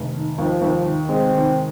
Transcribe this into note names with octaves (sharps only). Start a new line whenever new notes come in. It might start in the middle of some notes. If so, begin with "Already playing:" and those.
Already playing: F1 D#3
D#3
D#2 F3
D#2
D#3
G#3 C4
D#3